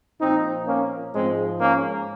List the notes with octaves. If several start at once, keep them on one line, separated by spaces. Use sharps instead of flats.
A#2 F3 C4 D#4
A#3 C#4
G#2 F3 G#3 C4
A#3 C#4